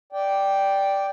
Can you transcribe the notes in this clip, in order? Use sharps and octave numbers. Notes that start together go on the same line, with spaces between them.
D5 G5